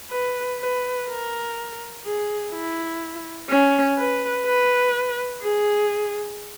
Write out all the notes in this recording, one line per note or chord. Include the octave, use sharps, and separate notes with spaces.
B4
B4
A#4
G#4
E4
C#4
B4
B4
G#4